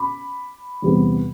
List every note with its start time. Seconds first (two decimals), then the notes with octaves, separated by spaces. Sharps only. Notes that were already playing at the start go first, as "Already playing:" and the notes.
Already playing: B5 D6
0.82 E2 C3 G3 B3